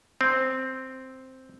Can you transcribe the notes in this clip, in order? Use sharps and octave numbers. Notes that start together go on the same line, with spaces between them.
C4